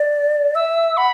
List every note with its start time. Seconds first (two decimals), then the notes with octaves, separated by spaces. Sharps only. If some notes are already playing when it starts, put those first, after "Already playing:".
Already playing: D5
0.55 E5 E6
0.97 F#5 B5